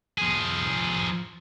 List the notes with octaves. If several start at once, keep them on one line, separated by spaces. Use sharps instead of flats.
F3 G#4